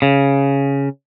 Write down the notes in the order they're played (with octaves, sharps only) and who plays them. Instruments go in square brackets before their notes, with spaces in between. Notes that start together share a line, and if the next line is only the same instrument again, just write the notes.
[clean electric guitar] C#3